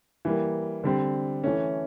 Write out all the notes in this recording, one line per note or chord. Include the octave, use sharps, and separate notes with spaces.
E3 G3 A#3
D3 G3 C4
E3 A3 C#4